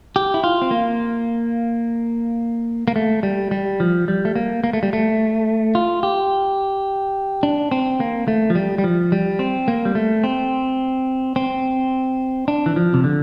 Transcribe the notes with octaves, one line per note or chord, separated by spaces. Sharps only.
G4
E4
F4
C4
A#3
A#3
A3
G3
G3
F3
G3
A3
A#3
A#3
A3
G3
A3
F4
G4
D4
C4
A#3
A3
F3
G3
G3
F3
G3
C4
A#3
G3
A3
C4
C4
D4
E3
F3
C3
D3